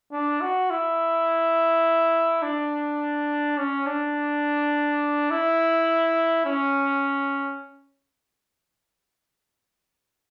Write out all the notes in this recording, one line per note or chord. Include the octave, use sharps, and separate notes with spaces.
D4
F#4
E4
D4
C#4
D4
E4
C#4